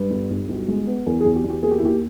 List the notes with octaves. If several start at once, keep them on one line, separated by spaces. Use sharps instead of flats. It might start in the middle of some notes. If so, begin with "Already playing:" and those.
Already playing: G2 B4
G1
G1
B1
G#3
B3
E2 A#4
G#4
E2
G4
E2
G4
A#3 G#4
G4
E4
D#2 G4